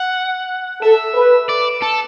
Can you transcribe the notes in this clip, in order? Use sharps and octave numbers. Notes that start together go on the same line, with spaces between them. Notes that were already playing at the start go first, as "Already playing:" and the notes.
Already playing: F#5
A4 E5
B4
D5
A4